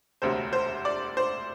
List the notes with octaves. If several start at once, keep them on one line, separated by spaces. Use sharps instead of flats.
E1 D2 C3 C5
C5
D5
C5